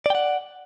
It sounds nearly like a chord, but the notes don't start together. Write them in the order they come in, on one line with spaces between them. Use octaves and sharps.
D5 G5 F#5